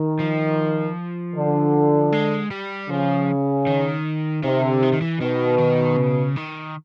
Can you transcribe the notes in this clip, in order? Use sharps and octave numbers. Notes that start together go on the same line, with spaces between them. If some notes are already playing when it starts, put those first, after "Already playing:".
Already playing: D#3
F3
D3
G#3
G3
C#3 F3
D#3
C3 D#3
D3
D#3
D#3
E3
B2 D#3
D#3
C#3
D#3